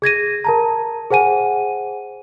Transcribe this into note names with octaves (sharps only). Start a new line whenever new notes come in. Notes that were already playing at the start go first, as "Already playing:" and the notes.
G#4 G#6 A#6 D#7
A#4 A5 A#5
G#4 C5 F#5 G#5 D#7